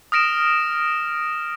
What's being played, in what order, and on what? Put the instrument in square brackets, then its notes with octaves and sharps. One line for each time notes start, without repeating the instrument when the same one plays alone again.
[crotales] D#6 F6 A#6 D7 E7